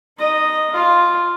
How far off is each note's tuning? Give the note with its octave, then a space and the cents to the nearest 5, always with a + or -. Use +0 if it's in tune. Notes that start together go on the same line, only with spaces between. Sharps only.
D#4 +0 D#5 -5
F4 +0 F5 +0